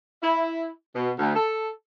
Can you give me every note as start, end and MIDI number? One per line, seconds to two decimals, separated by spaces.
0.23 0.68 64
0.95 1.10 47
1.19 1.35 38
1.36 1.68 69